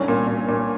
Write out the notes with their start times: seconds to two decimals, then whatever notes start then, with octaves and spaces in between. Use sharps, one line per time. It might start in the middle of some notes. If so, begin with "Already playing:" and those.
Already playing: C2 G2 C#4
0.08 A#2
0.27 A#2
0.48 A#2